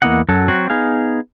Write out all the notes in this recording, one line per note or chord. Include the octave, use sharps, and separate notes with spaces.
E2 A#3 B3 E4 D#5 F#5
F#2 F#3 A4
F#3 C4 F#4
B3 D#4 G#4 F5